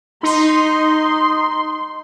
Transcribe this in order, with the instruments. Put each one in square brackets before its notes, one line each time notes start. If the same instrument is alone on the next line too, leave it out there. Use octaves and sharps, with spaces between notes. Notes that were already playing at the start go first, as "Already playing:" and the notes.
[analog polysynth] D#4 [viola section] C6